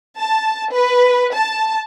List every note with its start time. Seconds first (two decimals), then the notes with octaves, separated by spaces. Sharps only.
0.19 A5
0.73 B4
1.34 A5